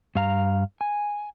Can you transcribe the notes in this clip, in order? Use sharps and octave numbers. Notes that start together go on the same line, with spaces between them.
G2 F5 A#5
G#5